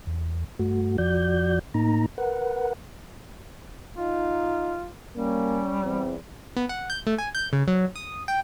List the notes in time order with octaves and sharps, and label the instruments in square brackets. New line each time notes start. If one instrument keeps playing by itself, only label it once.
[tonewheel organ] E2
G2 A3 F#4
F2 F3 F#4 D5 G6
A2 A#3 D#4 A#5
A#4 B4 F#5
[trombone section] D#4 [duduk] F4
[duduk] G3 [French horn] A#3 [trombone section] C#4
[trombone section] E2 [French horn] C4
[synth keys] B3
F#5
G6
A3
G#5
G6
C#3
F#3
D#6
G5